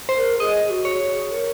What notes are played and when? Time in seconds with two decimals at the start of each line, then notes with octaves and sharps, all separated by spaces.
0.09 C5
0.17 A#4
0.39 G#4 D#5
0.70 F#4
0.85 C#5
1.01 G#4
1.31 A#4